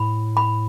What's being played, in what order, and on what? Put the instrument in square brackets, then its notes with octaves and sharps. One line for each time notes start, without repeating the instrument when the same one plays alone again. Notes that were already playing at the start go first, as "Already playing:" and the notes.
Already playing: [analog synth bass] A2 [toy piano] B5
[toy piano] B5